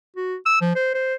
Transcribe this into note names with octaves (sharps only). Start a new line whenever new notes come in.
F#4
E6
F3
C5
C5